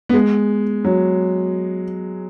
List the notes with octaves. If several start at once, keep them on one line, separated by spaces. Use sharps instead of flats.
B3
G#3
F#3